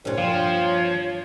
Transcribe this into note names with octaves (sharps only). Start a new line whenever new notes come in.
C2 G2 A#2 C#5
F3 F4